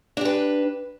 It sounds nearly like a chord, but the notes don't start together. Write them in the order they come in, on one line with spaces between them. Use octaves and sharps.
D4 G4 B4